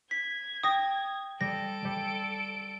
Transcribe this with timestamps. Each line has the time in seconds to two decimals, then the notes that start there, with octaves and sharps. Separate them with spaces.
0.11 G#6 B6
0.63 G5 D#6 A#6
1.41 G3 A4 A#6 D7
1.85 G3